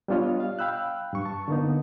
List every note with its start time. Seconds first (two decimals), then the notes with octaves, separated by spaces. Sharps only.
0.08 G3 B3 D4 F4 C#5 D#5
0.40 F5
0.59 F5 G5 B5 E6 F#6
1.13 G2 C#6
1.25 A5 C#6
1.48 D3 A#3 B3 D#4